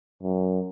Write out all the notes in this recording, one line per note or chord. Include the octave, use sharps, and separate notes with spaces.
F#2